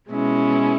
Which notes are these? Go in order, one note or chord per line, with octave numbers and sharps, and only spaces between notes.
B2 G#3 C#4 E4